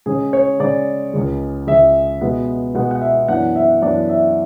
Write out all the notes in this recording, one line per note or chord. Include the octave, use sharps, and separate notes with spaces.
C#3 G#3 C#4 G#4
C#5
C#3 G#3 C#4 D5
C#2 C#3 G#3
C#2 C#3 G#3 E5
B2 G#3 B3
B2 G#3 B3 F#5
F#5
E5
F#2 E3 B3 D4 F#5
E5
F#2 E3 B3 D4 D5
E5